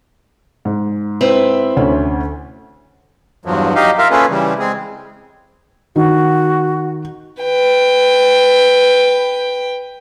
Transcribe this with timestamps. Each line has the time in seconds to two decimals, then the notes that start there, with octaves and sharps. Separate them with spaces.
0.65 G#2
1.21 C4 E4 B4
1.77 D2 C#4 C#5
3.45 E2 G2 F3 F#3
3.75 F#3 D#4 G4 D#5 F5
3.98 F4 A#4 E5 F5
4.11 A#3 C#4 F4 G#4 A4 B4
4.29 C#3 E3 G3
4.59 G#3 C4 G#4
5.96 D#3 F#4
7.43 B4 G5